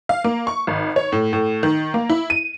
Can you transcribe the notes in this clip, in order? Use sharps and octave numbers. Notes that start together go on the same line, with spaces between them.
F5
A#3
C#6
G#1
C#5
A2
A2
D#3
A#3
E4
D#7